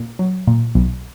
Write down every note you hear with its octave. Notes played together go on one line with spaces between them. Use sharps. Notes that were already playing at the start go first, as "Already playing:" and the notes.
Already playing: A#2
F#3
A#2
B1